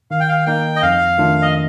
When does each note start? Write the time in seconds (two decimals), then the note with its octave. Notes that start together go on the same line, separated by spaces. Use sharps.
0.11 D#3 F5
0.20 G5
0.29 F5
0.46 A#3 D#4 G5
0.76 D#5
0.82 F2 F5
1.18 D#3 A3 D4 F4
1.42 D#5